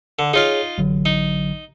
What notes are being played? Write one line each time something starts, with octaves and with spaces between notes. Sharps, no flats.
D3
D#4 F4 G#4 C#5 F5
A1 D3 F#3
D#4